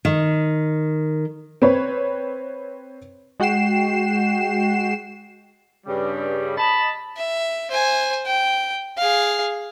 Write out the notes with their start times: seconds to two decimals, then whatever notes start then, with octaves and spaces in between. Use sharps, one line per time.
0.05 D#3
1.62 C4 B4 C#5
3.40 G#3 F#4 F#5 G5 C7 E7
5.87 G2 C#3 G3
6.57 D#5 A5 B5
7.17 E5
7.71 C5 G#5
8.26 G5
8.97 G#4 F5